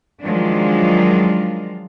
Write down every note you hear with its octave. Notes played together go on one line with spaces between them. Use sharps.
D#3 F3 F#3 G#3 D4 F4